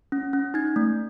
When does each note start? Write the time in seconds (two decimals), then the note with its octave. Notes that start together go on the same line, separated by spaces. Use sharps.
0.12 C#4
0.33 C#4
0.54 D#4 G#6
0.76 A3